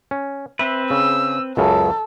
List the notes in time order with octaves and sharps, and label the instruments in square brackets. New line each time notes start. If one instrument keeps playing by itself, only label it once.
[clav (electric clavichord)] C#4
[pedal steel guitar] C4 B4 [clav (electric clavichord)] E5
[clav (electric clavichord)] C#3 [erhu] E6
[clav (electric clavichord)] C#2 F#2 C#3 [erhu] A4